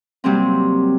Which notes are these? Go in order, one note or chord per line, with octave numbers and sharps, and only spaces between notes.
C3 F#3 G3 A#3 C4